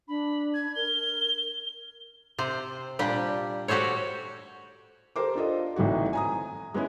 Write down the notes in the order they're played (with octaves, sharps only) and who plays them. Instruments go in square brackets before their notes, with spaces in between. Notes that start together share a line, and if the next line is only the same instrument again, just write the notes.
[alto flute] D4 [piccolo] B5
[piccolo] G#6
[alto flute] A#4 [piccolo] G7
[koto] C3 C5
A#2 G3 D4 G4
F#4 G4 A4 C5 C#5
[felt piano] G4 A4 A#4 C5 D6
D4 F4 A4 D#5
G#1 A2 E3 D#4 F#4
G#5 A#5 D#6
G#3 B3 C#4 E4